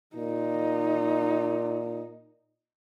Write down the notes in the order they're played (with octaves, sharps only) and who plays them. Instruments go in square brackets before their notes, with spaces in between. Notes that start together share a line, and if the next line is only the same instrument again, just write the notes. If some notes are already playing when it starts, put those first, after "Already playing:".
[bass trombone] A#2 [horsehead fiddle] D#4